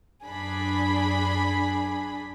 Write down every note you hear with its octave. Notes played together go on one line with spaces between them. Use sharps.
F#2 D4 G#4 B5